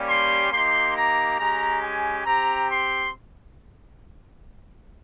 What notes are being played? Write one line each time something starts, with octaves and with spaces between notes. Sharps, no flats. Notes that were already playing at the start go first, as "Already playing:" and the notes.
Already playing: G3 A#3 C#4 G4
C6
A#3 D#4 G4 C6
A#5
G#3 C#4 G4 A#5
G#5
C4 G4 A#5
C6